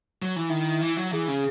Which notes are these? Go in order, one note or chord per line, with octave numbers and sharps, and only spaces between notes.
F#3
E3
D#3 E4
E3
F#3
E3 G#4
C#3